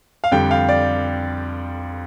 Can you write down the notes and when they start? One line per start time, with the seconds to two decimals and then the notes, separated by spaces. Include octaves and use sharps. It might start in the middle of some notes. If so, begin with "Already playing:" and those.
0.24 F5
0.31 F2 D3 G3 G5
0.51 F5
0.69 D5